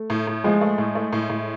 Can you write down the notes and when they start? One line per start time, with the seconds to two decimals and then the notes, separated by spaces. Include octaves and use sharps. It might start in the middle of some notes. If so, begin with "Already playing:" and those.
Already playing: A3
0.10 A2
0.27 A2
0.44 F3 G#3
0.61 A3
0.78 A2
0.95 A3
1.13 A2
1.30 A2